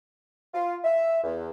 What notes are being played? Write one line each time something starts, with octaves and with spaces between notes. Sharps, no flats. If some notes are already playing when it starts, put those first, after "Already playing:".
F4
E5
E2